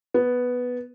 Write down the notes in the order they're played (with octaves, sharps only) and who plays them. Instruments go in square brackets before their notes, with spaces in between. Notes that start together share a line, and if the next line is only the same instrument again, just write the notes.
[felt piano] B3